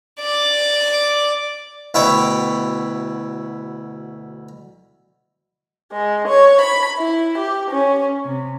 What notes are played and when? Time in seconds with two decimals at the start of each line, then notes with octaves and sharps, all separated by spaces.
0.20 D5 D6
1.94 D2 B2 B3 E4 C#5 G5
5.93 G#3
6.28 C#5
6.61 B5
6.98 E4
7.39 G4
7.69 C#4
8.25 C3